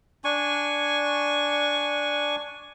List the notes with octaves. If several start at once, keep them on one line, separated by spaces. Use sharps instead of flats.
D4 G#5 C#6